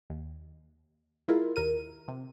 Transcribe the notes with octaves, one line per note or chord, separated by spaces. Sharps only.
D#2
G#3 E4 F4 A#4
D#2 A#4 D#7
C3